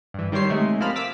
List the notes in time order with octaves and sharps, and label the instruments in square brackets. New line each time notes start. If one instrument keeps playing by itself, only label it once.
[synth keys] G2 E3
D#3 G3 C5 C#5 C7
C3 G#3 A3
F3 A#3 C4 A5 B5 F6
D6 E6 B6